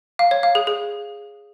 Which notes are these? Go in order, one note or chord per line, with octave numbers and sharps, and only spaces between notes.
F5
C#5
F5
G#4
G#4